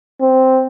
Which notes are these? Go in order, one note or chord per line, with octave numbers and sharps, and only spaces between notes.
C4